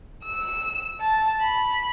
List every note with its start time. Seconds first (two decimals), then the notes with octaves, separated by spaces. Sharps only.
0.24 E6
1.00 A5
1.42 B5